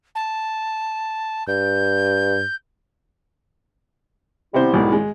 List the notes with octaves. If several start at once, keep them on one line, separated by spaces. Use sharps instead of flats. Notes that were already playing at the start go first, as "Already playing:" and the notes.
A5
G2 G6
C3 G3 B3 E4 C5
B1 G#2 D#3
G#3